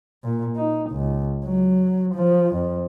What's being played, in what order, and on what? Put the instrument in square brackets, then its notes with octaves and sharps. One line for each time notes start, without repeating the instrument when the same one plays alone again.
[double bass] A#2
D#4
C#2
F#3
F3
F2